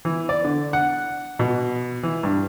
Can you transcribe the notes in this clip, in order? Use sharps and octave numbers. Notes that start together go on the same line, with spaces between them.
E3
D5
D3
F#5
B2
E3
G2